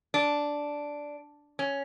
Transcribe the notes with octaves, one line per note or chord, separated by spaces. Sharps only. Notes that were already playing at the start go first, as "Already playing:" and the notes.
D4
C#4